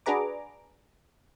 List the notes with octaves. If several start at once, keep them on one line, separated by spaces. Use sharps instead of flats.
D4 F#4 G#4 B4 A#5 D6